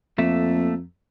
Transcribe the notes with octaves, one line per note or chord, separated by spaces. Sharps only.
F2 A3 A#3 E5